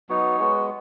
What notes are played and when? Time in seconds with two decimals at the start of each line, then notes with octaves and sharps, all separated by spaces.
0.09 F#3 B3 D#4 C#5
0.39 G#3 B3 F#4